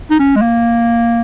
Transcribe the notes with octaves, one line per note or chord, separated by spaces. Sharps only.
D#4
C#4
G#3
A#3